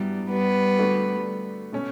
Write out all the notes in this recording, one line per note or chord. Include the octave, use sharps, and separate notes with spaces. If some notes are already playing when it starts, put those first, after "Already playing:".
Already playing: G2 F#3 G3 B3 E4
G3 B3
D3 A3 D4 F#4 A4
B2 A3 C#4